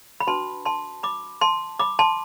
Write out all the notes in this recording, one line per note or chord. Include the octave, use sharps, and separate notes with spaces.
B5
D4 F#4 B4 A5 C6
A5 C6
B5 D6
A5 C6
B5 D6
A5 C6